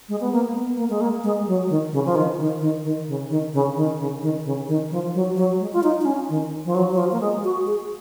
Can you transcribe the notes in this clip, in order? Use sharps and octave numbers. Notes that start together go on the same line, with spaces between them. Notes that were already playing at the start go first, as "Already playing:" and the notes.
G#3
B3
A#3
B3
A#3
G#3
A#3
G#3
F#3
D#3
C#3
F3
D#3
D#3
D#3
D#3
C#3
D#3
C#3
D#3
C#3
D#3
C#3
D#3
F3
F#3
F#3
G#3
F4
D#4
D#4
C#4
D#3
F3
F#3
F#3
F3
A#3
G#3
F#4
G#4